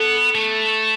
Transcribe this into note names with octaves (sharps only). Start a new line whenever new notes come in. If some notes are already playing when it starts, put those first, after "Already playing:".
Already playing: B3 A4
A3